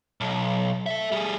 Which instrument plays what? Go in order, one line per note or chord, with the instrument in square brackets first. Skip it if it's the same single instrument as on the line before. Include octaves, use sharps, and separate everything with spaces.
[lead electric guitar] B1
A4 E5
G3 G#4